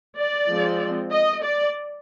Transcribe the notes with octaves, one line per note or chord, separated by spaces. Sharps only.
D5
F3 G#3 C4
D#5
D5